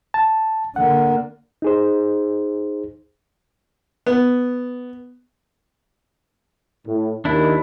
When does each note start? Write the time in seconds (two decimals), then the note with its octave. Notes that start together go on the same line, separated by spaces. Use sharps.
0.14 A5
0.76 D3 A#3 F#5
1.62 D#4 G#4 C5
4.06 B3
6.86 A2
7.25 D#2 D#3 D4 E4